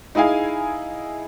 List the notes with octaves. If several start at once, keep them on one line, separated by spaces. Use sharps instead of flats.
D#4 E4 G#4 F5 G#5